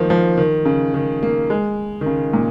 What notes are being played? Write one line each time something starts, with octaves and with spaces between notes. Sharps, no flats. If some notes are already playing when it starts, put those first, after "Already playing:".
Already playing: D#3 F3 A#3
F3
D#3
C#3
D#3
A#3
G#3
D#3
C#3
A#2